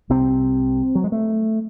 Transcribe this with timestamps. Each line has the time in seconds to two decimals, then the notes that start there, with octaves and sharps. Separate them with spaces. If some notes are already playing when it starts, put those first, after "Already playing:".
0.10 C2 C3 C4
0.95 F#3
1.04 G#3
1.12 A3